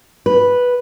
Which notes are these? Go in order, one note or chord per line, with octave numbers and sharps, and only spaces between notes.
B4